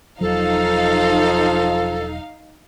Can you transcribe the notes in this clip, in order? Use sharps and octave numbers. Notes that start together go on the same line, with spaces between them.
E1 F3 F#3 D#4 A4 F5